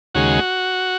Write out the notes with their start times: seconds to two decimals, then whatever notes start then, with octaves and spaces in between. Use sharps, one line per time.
0.15 D#2 C#3 G#3 F#4